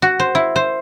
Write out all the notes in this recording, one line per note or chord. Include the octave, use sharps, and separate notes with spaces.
F#4
C5
E4
C5